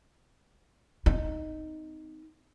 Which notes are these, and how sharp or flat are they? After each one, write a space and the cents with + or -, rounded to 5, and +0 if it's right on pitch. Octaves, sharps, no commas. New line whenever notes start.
C4 -35 D#4 +0